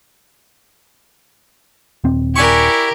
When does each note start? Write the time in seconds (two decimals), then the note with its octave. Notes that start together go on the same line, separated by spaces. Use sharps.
2.04 D#1 C4
2.36 D4 E4 G4 A#4 G#5 C#6